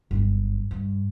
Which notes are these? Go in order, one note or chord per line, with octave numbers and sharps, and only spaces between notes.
G1 F#2
G2